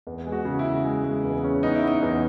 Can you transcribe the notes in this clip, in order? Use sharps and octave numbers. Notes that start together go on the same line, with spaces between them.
E2
G#3
F#4
C#3
E4
C#3
G#3
G#3
E2
C#4
B3 D#4
E4
B3
D#4
E2